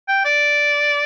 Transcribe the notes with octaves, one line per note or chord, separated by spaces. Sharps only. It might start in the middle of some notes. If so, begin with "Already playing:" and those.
G5
D5